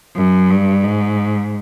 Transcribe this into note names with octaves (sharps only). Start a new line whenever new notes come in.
F#2
G2
G#2